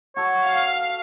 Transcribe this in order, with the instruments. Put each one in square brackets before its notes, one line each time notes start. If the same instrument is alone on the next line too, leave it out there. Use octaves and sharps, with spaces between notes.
[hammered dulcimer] F#4 A4 [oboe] C#5
[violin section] F5